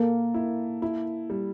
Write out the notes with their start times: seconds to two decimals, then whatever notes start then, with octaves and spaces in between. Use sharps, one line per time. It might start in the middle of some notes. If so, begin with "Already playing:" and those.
Already playing: A#3 A4
0.34 E4
0.82 E4
1.30 G3